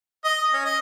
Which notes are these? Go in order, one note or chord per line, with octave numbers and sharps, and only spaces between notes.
D#5
C#4
D#5